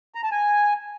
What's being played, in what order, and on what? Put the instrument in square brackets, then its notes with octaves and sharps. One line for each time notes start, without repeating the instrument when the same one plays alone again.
[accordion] A#5
A5
G#5